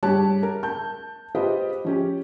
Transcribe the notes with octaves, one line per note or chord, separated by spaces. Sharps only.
G2 G4 C#5 A5 F#6
A#4
A5 G6
F4 G4 B4 C5 D#5
F3 C#4 G4